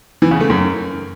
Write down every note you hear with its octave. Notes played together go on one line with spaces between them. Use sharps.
E3
C#3
A3
F#2